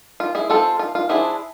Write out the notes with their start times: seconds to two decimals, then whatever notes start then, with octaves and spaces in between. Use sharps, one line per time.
0.20 F4
0.35 E4 G#4
0.50 G#3 C4 F4 A4
0.79 F4
0.95 F4
1.09 F3 G#3 D4 E4 G#4